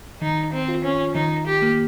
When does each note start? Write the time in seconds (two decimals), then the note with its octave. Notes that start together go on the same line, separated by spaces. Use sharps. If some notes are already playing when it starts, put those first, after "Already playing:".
0.22 D#3 D#4
0.53 C4
0.68 F4
0.84 C#4
1.15 D#3 D#4
1.46 G4
1.62 A#3